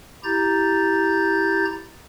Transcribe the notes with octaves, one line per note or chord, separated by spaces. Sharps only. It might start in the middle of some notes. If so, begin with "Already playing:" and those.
E4 G4 A#5 G6 A6